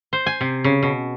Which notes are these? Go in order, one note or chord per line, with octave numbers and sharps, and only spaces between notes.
C5
G#5
C3
C#3
B2